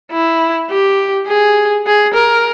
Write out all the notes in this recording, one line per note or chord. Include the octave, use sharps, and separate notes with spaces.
E4
G4
G#4
G#4
A#4